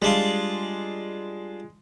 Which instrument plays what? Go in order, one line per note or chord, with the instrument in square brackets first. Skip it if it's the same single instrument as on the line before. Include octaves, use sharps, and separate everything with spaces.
[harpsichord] G3 D4 F4 [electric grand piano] G#3